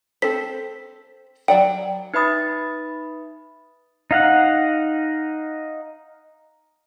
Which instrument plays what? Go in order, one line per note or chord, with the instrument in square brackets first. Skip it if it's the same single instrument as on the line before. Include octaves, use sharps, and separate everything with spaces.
[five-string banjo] C4 A4 C5 [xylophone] B6
[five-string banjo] F#3 D5 F#5 [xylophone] G5
[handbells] D#4 B4 E5 B5 D#6 A6
[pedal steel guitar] D#4 F5 F#5